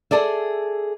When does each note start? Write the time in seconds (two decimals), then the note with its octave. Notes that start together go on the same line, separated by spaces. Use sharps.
0.11 G#4 A4 D5 E5